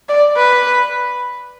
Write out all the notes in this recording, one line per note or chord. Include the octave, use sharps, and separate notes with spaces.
D5
B4